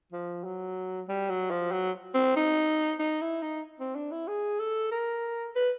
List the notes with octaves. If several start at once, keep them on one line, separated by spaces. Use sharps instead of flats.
F3
F#3
G3
F#3
F3
F#3
C4
D#4
D#4
E4
D#4
C4
D4
E4
G#4
A4
A#4
B4